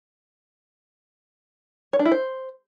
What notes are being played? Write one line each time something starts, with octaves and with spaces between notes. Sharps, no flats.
C#5
D4
E4
C5